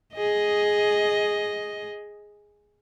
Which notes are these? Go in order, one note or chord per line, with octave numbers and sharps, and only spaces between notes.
G#4 D#5